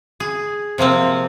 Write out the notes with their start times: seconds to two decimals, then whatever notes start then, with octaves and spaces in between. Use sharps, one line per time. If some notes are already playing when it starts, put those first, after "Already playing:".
0.20 G#4
0.78 C3 F3 A#3 C4